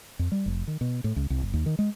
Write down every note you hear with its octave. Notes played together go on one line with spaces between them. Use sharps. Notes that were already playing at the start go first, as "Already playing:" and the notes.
F2
G3
F1
D#3
B2
A2
C#2
C2
F#1
D#2
D#3
G#3